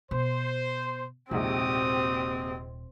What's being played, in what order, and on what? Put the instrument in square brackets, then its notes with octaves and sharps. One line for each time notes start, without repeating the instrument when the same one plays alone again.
[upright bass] B2 [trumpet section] C5
[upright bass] D#1 [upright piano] A#1 G#2 C3 [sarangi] C4 [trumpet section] F#4 G4 D#6